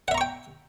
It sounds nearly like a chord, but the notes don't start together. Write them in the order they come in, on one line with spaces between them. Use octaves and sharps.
F#5 E5 A#5 C#6 G5